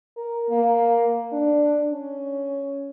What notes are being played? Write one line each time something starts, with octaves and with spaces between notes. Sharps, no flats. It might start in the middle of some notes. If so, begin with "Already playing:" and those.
A#4
A#3
D4
C#4